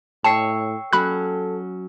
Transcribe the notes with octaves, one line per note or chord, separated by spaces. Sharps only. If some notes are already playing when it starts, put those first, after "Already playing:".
A2 C#5 G5 A5 C#6 E6 C7
F#3 C#4 A4 B5 F#6